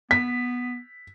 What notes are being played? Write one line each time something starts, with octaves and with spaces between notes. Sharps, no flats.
B3 B6